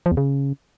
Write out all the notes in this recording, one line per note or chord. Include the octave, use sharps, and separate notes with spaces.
F3
E2
C#3